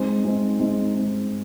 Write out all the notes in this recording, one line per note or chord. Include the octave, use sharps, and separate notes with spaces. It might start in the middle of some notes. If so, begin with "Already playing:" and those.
Already playing: G#3 C4 D#4
G#3 C4 D#4
G#3 C4 D#4
G#3 C4 D#4